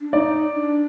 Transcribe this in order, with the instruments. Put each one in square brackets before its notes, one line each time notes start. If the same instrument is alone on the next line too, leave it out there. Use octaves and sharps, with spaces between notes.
[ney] D4
[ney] D#4 [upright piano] D5
[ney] D4